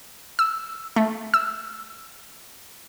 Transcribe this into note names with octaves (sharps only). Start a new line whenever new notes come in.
E6
A3
E6